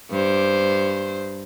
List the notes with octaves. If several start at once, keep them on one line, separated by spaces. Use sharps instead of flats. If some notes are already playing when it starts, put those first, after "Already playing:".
G2 C5